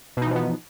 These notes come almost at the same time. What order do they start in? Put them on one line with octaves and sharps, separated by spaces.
B2 D#4 E3 F3 B3